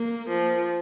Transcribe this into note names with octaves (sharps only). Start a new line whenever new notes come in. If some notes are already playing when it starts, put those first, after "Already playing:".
Already playing: A#3
F3